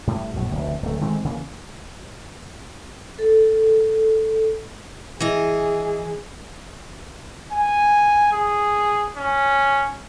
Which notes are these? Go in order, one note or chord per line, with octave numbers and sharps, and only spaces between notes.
A2 G3
A#1 F#2 A2
F1 D2
D1 A3
D#3 G#3 A3 C4
C#3 E3 A#3
A4
E3 G#4 D#5
G#5
G#4
C#4